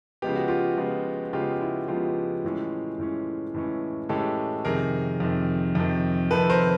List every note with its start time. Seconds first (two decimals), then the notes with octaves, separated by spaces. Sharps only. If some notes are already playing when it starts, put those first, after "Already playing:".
0.22 C#3 F3 G#3 B3 G4
0.36 F#4
0.48 F4 G4
0.78 C#3 F3 G#3 B3
1.33 C#3 F3 G#3 B3 F4 G4
1.61 E4
1.88 C#3 F3 G#3 B3 F4 G4
2.44 A2 E3 G#3 C#4
2.99 A2 E3 G#3 C#4
3.54 A2 E3 G#3 C#4
4.09 A2 E3 G#3 C#4 G4 A4
4.65 F2 C3 D#3 G#4 A#4
5.20 F2 C3 D#3
5.75 F2 C3 D#3
6.31 F2 C3 D#3 A4 B4
6.50 A#4 C5